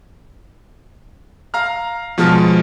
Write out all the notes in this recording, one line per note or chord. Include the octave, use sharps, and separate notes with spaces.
F5 A#5 F6
B2 F3 G#3 A5 F6